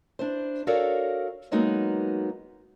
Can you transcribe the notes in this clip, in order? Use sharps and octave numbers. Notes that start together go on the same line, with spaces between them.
D4 E4 C5
F#4 A4 A#4 C#5 D5 F5
F#3 G#3 A#3 B3 D#4 F#4